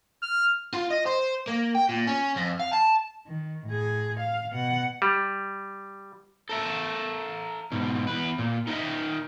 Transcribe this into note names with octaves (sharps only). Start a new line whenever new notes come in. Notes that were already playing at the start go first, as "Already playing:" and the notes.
F6
F4
D#5
C5
A#3
G5
A#2
C#4
F2
F5
A5
D#3
A2 G#4
F5
B2 F#5
G3
A4 A#4 E5
G#2 B2
E2 B4
A#2
D#4 A#4 B4 D#5 E5